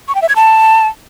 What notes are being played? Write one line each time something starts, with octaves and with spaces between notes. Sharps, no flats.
C#6
G5
E5
G#6
A5